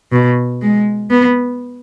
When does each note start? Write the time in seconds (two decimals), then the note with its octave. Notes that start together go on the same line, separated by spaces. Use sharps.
0.12 B2
0.62 G#3
1.10 B3